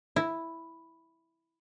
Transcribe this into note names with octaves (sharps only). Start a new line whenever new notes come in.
E4